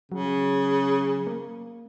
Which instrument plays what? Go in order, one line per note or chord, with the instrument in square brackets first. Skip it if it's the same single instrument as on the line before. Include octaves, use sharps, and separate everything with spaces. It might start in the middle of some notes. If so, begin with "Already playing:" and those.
[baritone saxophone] C#3 [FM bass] F#3
[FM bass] A#3